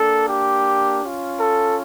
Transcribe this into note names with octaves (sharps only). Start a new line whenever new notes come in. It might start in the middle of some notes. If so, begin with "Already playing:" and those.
Already playing: A#3 D4 A4
G4
C#4 F4
A4